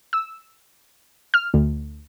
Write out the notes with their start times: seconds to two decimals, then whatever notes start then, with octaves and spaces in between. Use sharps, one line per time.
0.13 E6
1.34 F6
1.54 D2